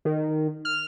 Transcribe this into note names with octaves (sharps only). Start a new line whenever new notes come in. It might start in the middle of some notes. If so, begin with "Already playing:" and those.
D#3
F6